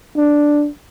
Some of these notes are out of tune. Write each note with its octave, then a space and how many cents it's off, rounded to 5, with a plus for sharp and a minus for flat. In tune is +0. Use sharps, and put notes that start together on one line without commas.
D4 +0